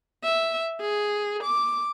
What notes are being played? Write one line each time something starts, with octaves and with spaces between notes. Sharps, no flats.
E5
G#4
D6